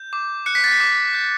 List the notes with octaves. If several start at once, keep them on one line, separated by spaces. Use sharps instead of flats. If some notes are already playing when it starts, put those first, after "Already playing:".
Already playing: G6
D6
F#6 C#7
B6
A6
B6
D6
G6